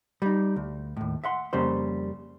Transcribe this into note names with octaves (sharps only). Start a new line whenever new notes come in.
G3 D#4
D2
D#2 A2
E5 F#5 C6
F2 C#3 G3 A#3 C5